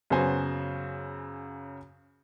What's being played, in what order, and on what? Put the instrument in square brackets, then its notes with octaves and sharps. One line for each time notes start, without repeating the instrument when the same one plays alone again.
[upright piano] F#2 C#3 B3 F#4 C5 G#5